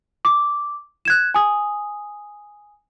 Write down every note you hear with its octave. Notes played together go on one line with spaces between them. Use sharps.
D6
F#6 G#6 E7
G#5 D#6